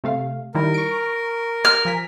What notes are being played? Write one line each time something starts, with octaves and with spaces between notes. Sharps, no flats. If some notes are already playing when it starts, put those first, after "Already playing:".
C3 A3 F5
D#3 G3 E4 A#4
C#6 D7
F6
F3 G#5 B6